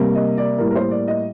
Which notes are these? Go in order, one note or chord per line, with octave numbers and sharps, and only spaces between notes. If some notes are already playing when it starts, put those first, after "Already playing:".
Already playing: C3 G3 A#3
D#5
D5
A2 G3 A#3 A#4
A#4
C5
D5
D#5